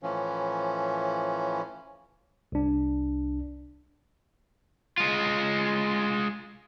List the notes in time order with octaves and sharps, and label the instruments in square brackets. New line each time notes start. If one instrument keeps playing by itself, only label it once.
[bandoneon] A2 E3 F3 C#4
[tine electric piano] C2 D4
[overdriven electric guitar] G#3 F4